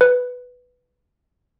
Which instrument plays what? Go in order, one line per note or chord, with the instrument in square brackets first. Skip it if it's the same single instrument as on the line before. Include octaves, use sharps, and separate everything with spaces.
[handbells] B4